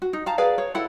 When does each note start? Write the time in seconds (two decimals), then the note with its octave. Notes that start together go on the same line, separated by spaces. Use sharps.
0.02 F#4
0.13 D#4
0.26 F5 A5 A#5
0.38 G#4 B4 D5 F5
0.58 C#5
0.75 E4 A4 F#5 B5